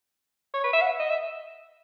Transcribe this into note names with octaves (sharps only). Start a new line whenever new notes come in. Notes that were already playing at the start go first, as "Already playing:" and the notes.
C#5
B4
E5
F#5
D#5
E5